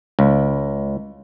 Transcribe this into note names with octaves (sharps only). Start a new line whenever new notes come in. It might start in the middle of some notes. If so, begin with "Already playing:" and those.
C#2